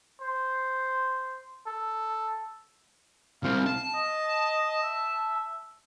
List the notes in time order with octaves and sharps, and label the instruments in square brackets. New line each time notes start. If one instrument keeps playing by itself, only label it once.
[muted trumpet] C5
A4
[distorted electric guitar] C2 C4 [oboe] F5
[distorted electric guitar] A5
[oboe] D#5
E5